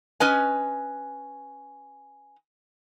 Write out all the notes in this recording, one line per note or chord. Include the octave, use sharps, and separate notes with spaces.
C#4 B4 D#5 G#5